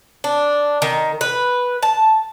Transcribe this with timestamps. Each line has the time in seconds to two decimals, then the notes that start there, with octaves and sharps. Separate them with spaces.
0.24 D4
0.82 D#3
1.21 B4
1.83 A5